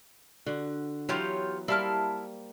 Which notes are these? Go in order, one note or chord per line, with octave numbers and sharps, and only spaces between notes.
D3 F#4
E3 F#3 B3 F4 G4 C#5
G3 A#3 E4 C5 A5 F6